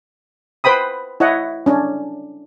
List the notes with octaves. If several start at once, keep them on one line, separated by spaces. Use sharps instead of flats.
B4 C5 G5 B5 D#6
E4 C#5 D#5 F#5
C#4 D4